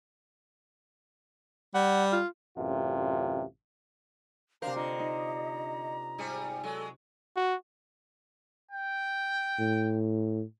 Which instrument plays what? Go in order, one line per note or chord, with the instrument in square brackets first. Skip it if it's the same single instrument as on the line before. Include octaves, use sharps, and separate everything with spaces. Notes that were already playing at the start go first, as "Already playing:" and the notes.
[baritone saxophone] G3 [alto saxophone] F#5
[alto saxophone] F4
[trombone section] A1 F#2 C3 F4
[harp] C3 C5 [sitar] D4 A#4 [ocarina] F5 [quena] A#5
[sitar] D3 [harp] F4 [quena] D#5 [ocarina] A#5
[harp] D#4
[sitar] G#2 G3 G#4
[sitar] F#3 G#3 [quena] A4
[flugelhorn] F#4
[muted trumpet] G5
[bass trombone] A2